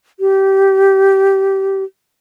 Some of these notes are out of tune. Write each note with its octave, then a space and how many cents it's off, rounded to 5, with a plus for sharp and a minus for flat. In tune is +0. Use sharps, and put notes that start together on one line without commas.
G4 -15